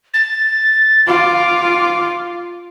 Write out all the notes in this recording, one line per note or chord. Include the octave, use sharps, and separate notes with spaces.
A6
F4 D6